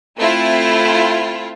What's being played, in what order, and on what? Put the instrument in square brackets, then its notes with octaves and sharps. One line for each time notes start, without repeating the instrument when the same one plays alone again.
[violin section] A3 C4 E4 F4